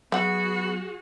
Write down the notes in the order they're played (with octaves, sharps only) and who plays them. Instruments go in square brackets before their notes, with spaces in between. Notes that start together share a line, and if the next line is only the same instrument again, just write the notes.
[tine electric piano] F#3 [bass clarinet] B3 [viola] F#4 G#4 [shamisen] E5 F#5